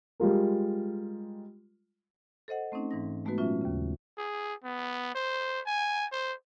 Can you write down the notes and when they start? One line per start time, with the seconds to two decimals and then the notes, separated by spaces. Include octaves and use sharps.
0.20 G3 G#3 F4 A#4
2.48 A4 C5 D#5 F#5
2.72 A3 C4 C#4 D#4
2.91 G#2 E3 D#4 A#6
3.25 G#3 A3 B3 D#4 F#4 B4
3.38 A#2 F#3 C#4 F4 E5
3.61 D#2 C#3
4.18 G#4
4.64 B3
5.15 C5
5.67 G#5
6.12 C5